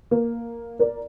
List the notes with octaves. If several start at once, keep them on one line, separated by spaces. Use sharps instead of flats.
A#3
A#4 D5